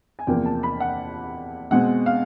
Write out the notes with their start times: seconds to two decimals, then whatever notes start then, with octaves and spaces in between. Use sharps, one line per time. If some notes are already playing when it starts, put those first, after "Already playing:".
0.19 G#5
0.27 E2 C3 F3 A#3 G5
0.46 A5
0.63 B5
0.80 F#5
1.71 B2 G#3 C4 F#5
2.06 F5